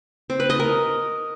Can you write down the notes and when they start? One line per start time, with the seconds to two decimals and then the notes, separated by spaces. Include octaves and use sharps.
0.30 C4
0.40 B4
0.50 D#5
0.60 A#4